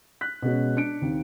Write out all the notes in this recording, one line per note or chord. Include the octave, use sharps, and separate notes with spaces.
F#6 B6
B2 G#3 B3 C#4
D4 C#7 D7
D#2 C4